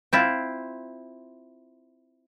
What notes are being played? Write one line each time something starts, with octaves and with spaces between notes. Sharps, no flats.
C4 E4 F4